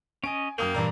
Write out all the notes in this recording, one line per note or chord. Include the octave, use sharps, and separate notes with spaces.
C#4 D#5 G#5 D7
F#2 A#3 G5 D#6 F7
G2 A#2 E3 D5 A#5